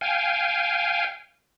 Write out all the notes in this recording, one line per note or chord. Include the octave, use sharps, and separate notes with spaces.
F5 G5 G#5